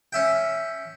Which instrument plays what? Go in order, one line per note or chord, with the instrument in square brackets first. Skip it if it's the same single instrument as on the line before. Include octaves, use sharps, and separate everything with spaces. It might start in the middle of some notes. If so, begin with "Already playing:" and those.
[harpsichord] C#4 E5 G5